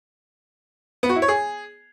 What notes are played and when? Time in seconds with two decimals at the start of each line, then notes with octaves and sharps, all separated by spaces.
1.03 B3
1.09 F#4
1.16 E4
1.22 C#5
1.28 G#4